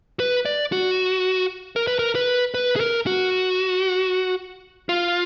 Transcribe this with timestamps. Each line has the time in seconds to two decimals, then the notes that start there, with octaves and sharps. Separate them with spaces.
0.20 B4
0.45 D5
0.72 F#4
1.76 A#4
1.87 B4
1.99 A#4
2.15 B4
2.54 B4
2.76 G#4
2.80 A#4
3.07 F#4
4.89 F4